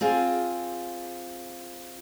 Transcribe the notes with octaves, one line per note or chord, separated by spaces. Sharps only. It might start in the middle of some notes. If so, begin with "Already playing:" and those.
C4 F4 G#4